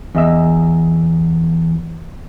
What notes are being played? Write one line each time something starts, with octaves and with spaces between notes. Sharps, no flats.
E2 D#5 E5